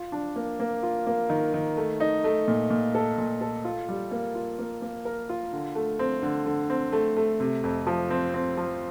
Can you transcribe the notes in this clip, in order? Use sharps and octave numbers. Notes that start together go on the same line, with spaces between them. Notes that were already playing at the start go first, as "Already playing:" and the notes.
Already playing: F4
D4
A#3
A#3
F4
A#3
D#3
D#3
A3
D#4
A3
A#2
A#2
A4
A#2
A4
F4
G3
A#3
F4
A#3
A#3
A#4
F4
D3
A3
C4
D3
D3
C4
A3
A3
C3
F2
F3
C4
C4
F3